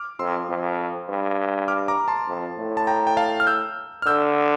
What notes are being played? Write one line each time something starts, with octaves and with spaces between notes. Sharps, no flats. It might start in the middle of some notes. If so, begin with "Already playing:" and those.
Already playing: D6 F6
F2 C6 E6
F2
G2
D6 F6
A#5 D6
A5 C6
F2
A2
A5
G5 A#5
G5
F5 A5
F6
E6 G6
F6
D3 E6 G6